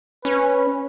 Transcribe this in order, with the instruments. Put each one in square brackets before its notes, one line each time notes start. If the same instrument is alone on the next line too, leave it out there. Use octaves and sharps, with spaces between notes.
[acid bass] C#4 [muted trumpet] B4